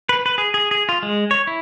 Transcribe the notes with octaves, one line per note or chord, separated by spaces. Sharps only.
B4
B4
G#4
G#4
G#4
F4
G#3
C#5
E4